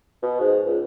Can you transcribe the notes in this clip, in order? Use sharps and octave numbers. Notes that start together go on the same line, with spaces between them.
B2
G#2
C#2